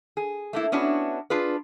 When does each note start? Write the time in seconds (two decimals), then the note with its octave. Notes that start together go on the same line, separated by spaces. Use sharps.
0.17 G#4
0.53 A3 A#3 E4
0.72 B3 C#4 D4 E4 F#4
1.30 D4 F4 G#4 B4